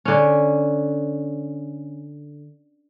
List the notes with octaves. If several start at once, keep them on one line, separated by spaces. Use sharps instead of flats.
D3 C#4